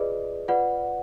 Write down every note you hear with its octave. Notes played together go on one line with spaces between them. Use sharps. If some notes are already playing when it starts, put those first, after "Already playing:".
Already playing: F4 G#4 B4 D5 D#5
F4 B4 D5 F#5